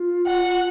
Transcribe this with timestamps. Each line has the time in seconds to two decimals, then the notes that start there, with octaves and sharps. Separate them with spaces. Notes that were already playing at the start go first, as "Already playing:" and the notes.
Already playing: F4
0.27 F#5